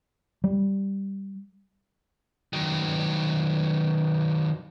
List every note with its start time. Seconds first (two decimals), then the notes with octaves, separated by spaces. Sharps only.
0.44 G3
2.53 D#3 F#3